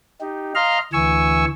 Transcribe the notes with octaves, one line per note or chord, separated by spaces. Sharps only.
D#4 G4
D#5 F5 A#5 C6 F6
D2 E3 G#5 C#6 E6